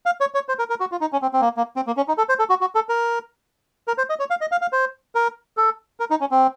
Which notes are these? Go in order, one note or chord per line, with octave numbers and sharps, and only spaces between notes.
F5
C#5
C#5
C5
A#4
A#4
F#4
F4
D#4
C#4
C4
C4
A#3
A#3
C4
A#3
C#4
D#4
A4
C5
A4
F#4
F#4
A4
A#4
A#4
C5
D#5
C#5
F5
D#5
F5
F5
C5
A#4
A4
A#4
D#4
C#4
C4